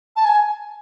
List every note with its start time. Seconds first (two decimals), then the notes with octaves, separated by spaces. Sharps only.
0.16 A5
0.25 G#5